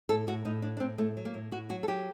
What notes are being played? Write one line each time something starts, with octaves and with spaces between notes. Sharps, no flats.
A2 A4
A2 F#4
A2 D#4
A2 D4
D4
A2 C4
A2 A3
F#3
A#3
A2
A2 F#4
F#3 F#4
A4
F#3 G4